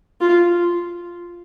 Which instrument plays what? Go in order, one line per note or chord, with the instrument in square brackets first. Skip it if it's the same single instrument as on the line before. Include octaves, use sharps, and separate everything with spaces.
[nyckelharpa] F4